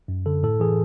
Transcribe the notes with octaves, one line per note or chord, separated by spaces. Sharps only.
F#2
D3 A4
A2 A4
E3 G#4